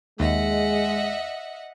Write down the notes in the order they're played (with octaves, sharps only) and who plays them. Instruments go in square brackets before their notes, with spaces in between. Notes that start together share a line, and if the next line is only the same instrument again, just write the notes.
[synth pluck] D#2 [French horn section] G#3 [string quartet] D#5 E5 F#5